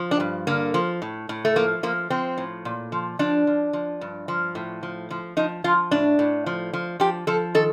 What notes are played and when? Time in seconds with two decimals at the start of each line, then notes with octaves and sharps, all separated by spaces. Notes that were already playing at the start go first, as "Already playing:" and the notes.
Already playing: F3
0.11 D4
0.20 G2
0.47 D3 A#3
0.74 F3
1.02 A2
1.29 A2
1.45 A3
1.56 F3 A#3
1.83 F3 A#3
2.10 F3 C4
2.38 A2
2.65 A#2
2.92 F3
3.19 F3 D4
3.47 F3
3.73 F3
4.01 G2
4.28 F3
4.55 A2
4.83 F3
5.10 F3
5.37 F3 D#4
5.64 F3 F4
5.91 A2 D4
6.19 A2
6.46 F3
6.73 F3
7.00 F3 G4
7.27 F3 A4
7.55 D#3 A4